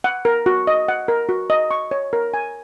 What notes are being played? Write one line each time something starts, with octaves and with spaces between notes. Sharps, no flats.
F#5
A#4
F#4
D#5
F#5
A#4
F#4
D#5
C#6
C#5
A#4
G#5